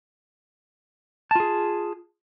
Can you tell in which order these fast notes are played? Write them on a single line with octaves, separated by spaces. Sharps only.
A5 F4 G#4